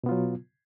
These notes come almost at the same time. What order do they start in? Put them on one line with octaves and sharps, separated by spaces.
B2 B3 F4 F#3